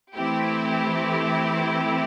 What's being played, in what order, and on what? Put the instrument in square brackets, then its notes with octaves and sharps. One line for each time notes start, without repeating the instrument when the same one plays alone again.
[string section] E3 A3 C4 E4 G4